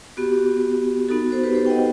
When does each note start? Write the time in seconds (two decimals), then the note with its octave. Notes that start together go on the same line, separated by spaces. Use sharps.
0.17 B3 F#4 G4
1.09 B3 D#4 F#4 A4
1.32 A4 C5
1.44 G4 B4
1.55 A4 C5
1.66 G5
1.70 D#5 F#5